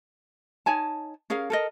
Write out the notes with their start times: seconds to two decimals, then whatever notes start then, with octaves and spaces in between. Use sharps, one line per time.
0.66 D#4 C#5 G#5 A5
1.30 C#4 G#4 A#4 F5
1.50 A4 A#4 D#5